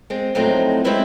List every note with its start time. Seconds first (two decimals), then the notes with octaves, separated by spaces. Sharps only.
0.10 G#3 C4
0.35 F2 A2 F#3 A3 C4 D#4
0.84 G#3 C4 C#4 E4 B4 E5